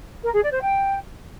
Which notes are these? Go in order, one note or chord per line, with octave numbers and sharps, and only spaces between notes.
A#4
G#4
D5
C5
G5